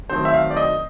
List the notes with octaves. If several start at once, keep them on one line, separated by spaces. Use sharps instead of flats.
D#3 F#3 A3 C4 C5
E5
F5
D5
D#5